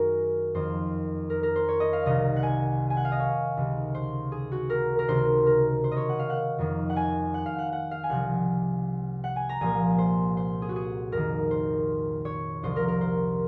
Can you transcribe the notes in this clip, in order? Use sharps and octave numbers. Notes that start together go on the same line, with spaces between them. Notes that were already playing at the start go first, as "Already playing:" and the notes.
Already playing: F#2 D#3 F#4 G#4 A#4
F2 D#3 C5
A#4
A#4
C5
C#5
D#5
F5
C2 C3 D#3 D#5
F#5
G#5
G#5
F#5
F5
D#5
C#5
C#2 C3 D#3
C5
G#4
F#4
A#4
A#4
C#2 C3 D#3 C5
A#4
C5
D#5
C#5
F#5
F5
F#5
F2 D#3
F#5
G#5
F#5
F5
F#5
F#5
F5
G#5
C2 C3 F3 F#5
F#5
G#5
A#5
C2 A#2 F3 G#5
C5
C5
G#4
F#4
G#4
F2 A#4
D#3
C5
C#5
C2 C3 F3 C5
A#4
A#4
C5